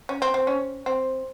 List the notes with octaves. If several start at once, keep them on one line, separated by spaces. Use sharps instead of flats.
C#4
C4
C4
C#4
C4